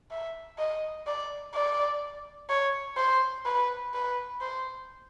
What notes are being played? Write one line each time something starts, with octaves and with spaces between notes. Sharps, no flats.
E5
D#5
D5
D5
C#5
C5
B4
B4
C5